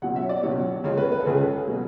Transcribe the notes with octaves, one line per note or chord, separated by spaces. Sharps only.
C#2 B2 F#3 F#5
E5
C#5
D5
C#2 B2 F#3 C#5
C#2 C#3 G#3 C#5
B4
B4
A4
C#2 C#3 G#3 G#4
A4
B2 F#3